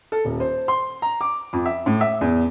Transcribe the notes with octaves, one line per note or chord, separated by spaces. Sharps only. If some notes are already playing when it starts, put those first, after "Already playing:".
A4
D#1
C5
C6
A#5
D6
F2
E5
A2
E5
E2